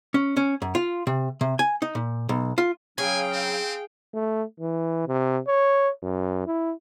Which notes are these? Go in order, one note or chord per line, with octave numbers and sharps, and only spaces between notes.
C#4
C#4
F#2
F4
C3
C3
G#5
D#4
A#2
B1
F4
C#3 F#3 C#4 G#4 F5 G5 G#5
C4
A3
E3
C3
C#5
F#2
E4